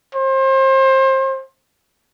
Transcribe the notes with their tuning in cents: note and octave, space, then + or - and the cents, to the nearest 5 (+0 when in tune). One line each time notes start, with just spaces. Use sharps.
C5 +30